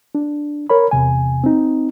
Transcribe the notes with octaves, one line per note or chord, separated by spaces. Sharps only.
D4
A#4 C#5 B5
E2 C3 G#5
C4 D#4